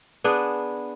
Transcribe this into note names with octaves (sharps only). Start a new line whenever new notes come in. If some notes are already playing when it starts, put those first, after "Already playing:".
B3 D4 G#4